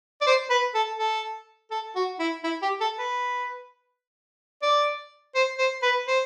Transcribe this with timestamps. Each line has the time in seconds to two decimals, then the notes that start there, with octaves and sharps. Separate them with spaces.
0.21 D5
0.27 C5
0.50 B4
0.74 A4
0.99 A4
1.71 A4
1.96 F#4
2.19 E4
2.43 E4
2.62 G4
2.81 A4
2.99 B4
4.62 D5
5.35 C5
5.58 C5
5.83 B4
6.08 C5